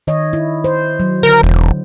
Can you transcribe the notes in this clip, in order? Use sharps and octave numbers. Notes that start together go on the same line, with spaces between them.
D#3 C#5 D#5
E4
C5
F#3
D3 A#4
E1